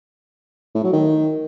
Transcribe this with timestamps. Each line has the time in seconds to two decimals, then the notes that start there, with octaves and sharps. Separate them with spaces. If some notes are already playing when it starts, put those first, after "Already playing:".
0.75 A2
0.84 F#3
0.93 D#3